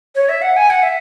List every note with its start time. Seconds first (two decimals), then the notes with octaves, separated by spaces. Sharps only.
0.15 C#5
0.29 E5
0.42 F#5
0.57 G#5
0.70 F#5
0.83 E5